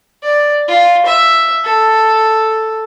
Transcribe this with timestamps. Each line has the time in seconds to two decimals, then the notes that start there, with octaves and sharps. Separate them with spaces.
0.23 D5
0.68 F4
1.06 E5
1.65 A4